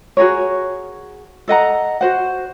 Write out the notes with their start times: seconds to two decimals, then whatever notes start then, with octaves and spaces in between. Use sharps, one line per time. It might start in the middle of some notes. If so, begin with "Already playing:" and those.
0.17 F#4 G#4 A#4 C#5
1.48 A4 D#5 F#5 A#5
2.01 F#4 C5 F#5